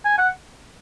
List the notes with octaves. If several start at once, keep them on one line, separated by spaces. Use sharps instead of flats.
G#5
F#5